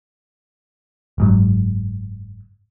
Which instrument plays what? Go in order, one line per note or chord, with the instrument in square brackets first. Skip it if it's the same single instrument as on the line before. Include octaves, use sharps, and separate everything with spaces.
[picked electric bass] F#1 G#2 F#3